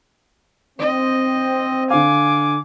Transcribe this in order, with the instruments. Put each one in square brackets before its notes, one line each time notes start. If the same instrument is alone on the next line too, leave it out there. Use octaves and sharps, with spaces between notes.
[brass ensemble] C4 [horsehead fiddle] D#5
[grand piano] D3 F5 [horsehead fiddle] G#5 [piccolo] D6